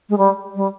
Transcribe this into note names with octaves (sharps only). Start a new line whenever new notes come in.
G#3
G3
G3